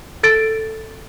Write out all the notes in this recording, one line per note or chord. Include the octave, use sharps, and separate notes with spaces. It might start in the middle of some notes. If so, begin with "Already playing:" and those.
A4 A6 D7